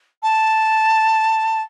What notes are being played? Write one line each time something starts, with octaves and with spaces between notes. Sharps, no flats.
A5